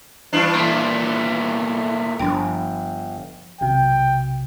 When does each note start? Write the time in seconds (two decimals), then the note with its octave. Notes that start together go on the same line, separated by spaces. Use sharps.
0.33 G2 E3 D4
0.55 A#2 A3
2.19 G1 F3 D4 G5
3.61 B1 C3 G5